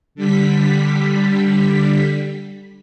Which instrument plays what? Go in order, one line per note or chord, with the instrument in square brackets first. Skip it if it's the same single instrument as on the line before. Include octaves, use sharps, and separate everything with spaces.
[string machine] D3 G3 B6